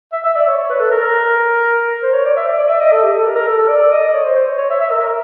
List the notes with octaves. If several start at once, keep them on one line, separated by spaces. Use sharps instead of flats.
E5
E5
D5
C#5
C#5
B4
A4
A#4
C5
C#5
D5
E5
D5
D5
E5
D#5
A4
G4
A4
A#4
A#4
A4
A4
D5
D#5
C#5
C5
C5
C#5
C#5
E5
E5
A#4